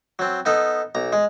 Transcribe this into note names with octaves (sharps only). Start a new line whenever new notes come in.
F#3 C4
B3 D#4 A4
B1 A#5
G#3